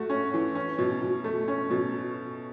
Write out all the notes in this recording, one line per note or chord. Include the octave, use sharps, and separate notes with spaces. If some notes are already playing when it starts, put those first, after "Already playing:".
Already playing: A3 F#4
C#4
E3
C#4
B2
B2
A3
C#4
B2